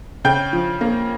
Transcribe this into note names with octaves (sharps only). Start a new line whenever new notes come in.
C#3 G5 G6
F3
A#3